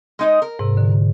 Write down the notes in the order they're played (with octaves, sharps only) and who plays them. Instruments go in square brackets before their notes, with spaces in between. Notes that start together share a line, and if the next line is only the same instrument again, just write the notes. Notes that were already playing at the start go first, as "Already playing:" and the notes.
[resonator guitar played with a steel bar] G#3 D#4 D#5
A#4
[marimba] G#2 C3
D3